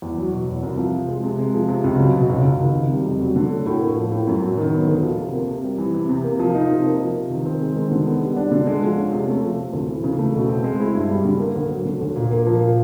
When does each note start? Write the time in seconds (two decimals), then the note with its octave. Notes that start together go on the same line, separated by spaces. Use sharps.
0.02 E2
0.17 F#3
0.32 B2
0.47 E2
0.63 C2
0.78 F3
0.93 C3
1.08 G#3
1.24 C3
1.38 G#3
1.54 F3
1.69 C3
1.84 C#2
2.00 F#3
2.15 B2
2.30 C#2
2.45 C#2
2.60 D#3
2.75 C3
2.91 G3
3.06 F2
3.21 F#3
3.36 D3
3.51 A3
3.66 A2
3.81 A#3
3.96 F3
4.12 A2
4.27 F#2
4.42 F#3
4.57 D#3
4.72 B3
4.88 D2
5.03 F3
5.18 C3
5.33 A#3
5.48 C3
5.64 G3
5.78 E3
5.94 C3
6.09 C3
6.24 A#3
6.39 F3
6.55 D#4
6.70 C3
6.85 A#3
7.00 F3
7.15 C3
7.30 D#3
7.45 C4
7.61 G#3
7.75 D#3
7.91 D3
8.06 B3
8.21 G3
8.37 D4
8.51 D3
8.67 G#3
8.83 F3
8.97 C#4
9.12 C3
9.27 A3
9.43 F3
9.58 C3
9.73 D2
9.89 E3
10.04 C#3
10.19 A3
10.34 B2
10.49 C4
10.64 G#3
10.80 E4
10.95 G2
11.10 G3
11.25 D3
11.40 A#3
11.56 D2
11.70 F#3
11.85 D3
12.01 D2
12.16 A#2
12.31 A#3
12.47 F3
12.61 A#2